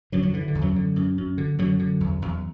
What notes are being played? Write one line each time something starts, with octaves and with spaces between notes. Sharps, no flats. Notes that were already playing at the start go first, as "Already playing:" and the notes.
F#2 D3 F#3
F#2 F#3
D3 E3
D3
E2
F#2 F#3
D3
F#2
F#2
D3
F#2 D3 F#3
D3
E2
E2